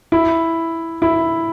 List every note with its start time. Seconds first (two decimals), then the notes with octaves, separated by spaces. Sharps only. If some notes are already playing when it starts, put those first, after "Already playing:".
0.12 E4
1.02 E4